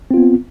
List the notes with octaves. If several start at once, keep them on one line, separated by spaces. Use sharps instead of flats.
B3 C4 F4